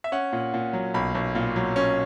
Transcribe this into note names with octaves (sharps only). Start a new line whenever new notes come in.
E5
C#4 F#5
A#2
A#2
F#3
B1 B5
B1
A#2
F#3
C#4